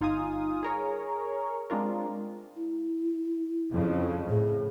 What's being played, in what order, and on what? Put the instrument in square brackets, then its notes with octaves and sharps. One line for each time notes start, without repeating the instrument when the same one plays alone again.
[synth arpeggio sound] G1 D#4 F4 F5 G#5 D#6
G#4 A#4 C#5
G#3 C4 D4 F4 A#4
[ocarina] E4
[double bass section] F2 C#3
[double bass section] A2 [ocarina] G#4